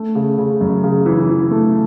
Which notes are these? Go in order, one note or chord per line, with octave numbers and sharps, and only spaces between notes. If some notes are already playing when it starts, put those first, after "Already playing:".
Already playing: A3
C#3
C#3
F#2
C#3
E3
E3
A3